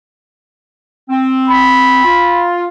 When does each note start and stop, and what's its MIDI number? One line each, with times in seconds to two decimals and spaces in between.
1.10 2.01 60
1.47 2.48 83
2.05 2.67 65